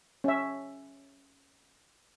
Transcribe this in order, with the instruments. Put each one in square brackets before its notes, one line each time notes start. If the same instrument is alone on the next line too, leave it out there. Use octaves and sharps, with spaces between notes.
[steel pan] C#4 E5